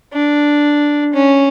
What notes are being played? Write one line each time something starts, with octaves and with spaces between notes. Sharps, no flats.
D4
C#4